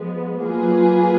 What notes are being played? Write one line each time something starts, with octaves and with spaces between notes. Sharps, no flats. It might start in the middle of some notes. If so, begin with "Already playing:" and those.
Already playing: F3 G#3 B3
F#3 A#3 F4 G#4 B4